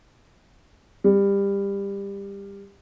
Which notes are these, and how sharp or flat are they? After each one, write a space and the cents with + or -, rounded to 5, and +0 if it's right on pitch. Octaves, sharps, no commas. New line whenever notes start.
G3 +20